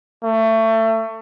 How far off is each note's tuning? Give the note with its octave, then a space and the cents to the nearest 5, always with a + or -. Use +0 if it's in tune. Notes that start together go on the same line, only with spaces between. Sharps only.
A3 +25